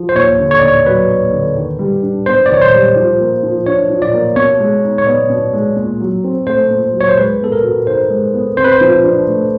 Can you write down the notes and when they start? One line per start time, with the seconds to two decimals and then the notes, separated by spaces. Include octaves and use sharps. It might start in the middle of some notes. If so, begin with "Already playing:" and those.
Already playing: F3
0.09 C5
0.15 D#2 C#5
0.39 D3
0.51 C#5
0.59 D#2 D5
0.68 C#5
0.86 F#3 B4
1.10 D#2
1.33 D3
1.57 D#3
1.79 G3
2.03 D4
2.26 B3 C5
2.46 D5
2.50 D#3 C#5
2.61 C5
2.73 G3
2.96 F3
3.20 A#3
3.43 F3
3.66 D4 C#5
3.90 F3
4.02 D5
4.13 A#3
4.36 B2 C#5
4.60 G#3
4.84 D#4
4.98 C#5
5.07 B3 D5
5.29 B2
5.53 G#3
5.76 A#2
6.00 F#3
6.24 C4
6.47 A3 C5
6.70 A#2
6.93 F#3
7.01 C#5
7.09 C5
7.17 G#3 B4
7.41 B3 A4
7.52 A#4
7.64 F#4
7.87 D#4 C5
8.10 G#3
8.34 B3
8.57 C3 C5
8.64 B4
8.72 C5
8.81 F3
9.04 D4
9.27 A3